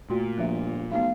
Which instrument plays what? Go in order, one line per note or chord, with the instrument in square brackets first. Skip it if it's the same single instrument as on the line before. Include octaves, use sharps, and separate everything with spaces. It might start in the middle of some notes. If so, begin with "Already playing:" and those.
[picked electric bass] A#2 [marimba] A3 F#4 C6
[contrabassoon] G1 [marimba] F3 E5
[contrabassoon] B1 [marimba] A3 B3 [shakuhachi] F5